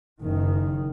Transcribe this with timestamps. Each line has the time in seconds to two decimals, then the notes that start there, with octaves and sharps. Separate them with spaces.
0.21 F#1 D#3